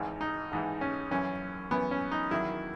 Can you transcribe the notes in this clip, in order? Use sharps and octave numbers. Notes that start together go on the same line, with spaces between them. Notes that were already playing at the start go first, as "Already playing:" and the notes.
Already playing: G#1 G#2 E3
D#4
G#1 G#2 E3
C#4
F#2 E3 C#4
F#2 E3 B3
C#4
D#4
E2 D#3 F#3 E4